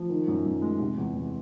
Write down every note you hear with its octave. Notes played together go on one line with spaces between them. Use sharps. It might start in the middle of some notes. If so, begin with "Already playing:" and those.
Already playing: F3
D#3
F#2
F#2
G#3
C3
E2
E2